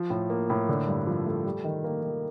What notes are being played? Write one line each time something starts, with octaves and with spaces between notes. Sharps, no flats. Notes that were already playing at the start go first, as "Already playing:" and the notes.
Already playing: F3
A2
A#3
A2
D3
G2
F3
A3
G3
D#3
A#3
D#3